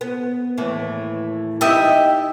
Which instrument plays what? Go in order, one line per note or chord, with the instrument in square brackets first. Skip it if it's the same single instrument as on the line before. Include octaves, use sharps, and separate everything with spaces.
[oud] B3
D#2 A2 E3
[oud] G3 D#4 E4 [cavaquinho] D#5 E5 G5